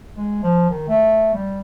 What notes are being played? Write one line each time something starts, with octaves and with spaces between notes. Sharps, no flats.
G#3
F3
D#3
A3
G3